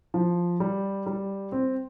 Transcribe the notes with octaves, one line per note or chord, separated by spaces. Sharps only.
F3
G3
G3
C4